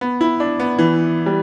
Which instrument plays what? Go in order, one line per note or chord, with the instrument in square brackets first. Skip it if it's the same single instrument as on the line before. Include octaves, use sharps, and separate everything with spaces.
[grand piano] B3
E4
D4
B3
E3
G3